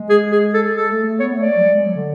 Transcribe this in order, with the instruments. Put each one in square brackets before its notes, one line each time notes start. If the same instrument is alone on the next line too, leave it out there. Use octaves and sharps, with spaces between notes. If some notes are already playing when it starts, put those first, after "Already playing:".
Already playing: [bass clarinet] G#3
[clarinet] G#4
G#4
A4
[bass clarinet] G#3 [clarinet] A4
[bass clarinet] A3
A3
[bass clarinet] B3 [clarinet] C#5
[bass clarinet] A3
[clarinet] D5
[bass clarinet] A3
F#3
G#3
G#3
F#3
D3